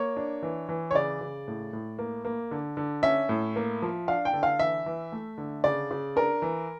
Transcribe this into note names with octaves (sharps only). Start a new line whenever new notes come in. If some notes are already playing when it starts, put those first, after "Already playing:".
Already playing: A#3 C#5
D4
E3
E3
C#5
C#3 D5
C#3
A2
A2
A#3
A#3
D3
D3
C#4 E5
A2
A#3
F3
D4 F5
G5
D3
F5
E3 E5
E3
A3
D3
C#3 D5
C#3
D4 A#4
E3